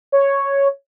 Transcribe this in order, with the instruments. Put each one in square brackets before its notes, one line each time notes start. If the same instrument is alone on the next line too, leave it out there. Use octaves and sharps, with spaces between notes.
[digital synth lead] C#5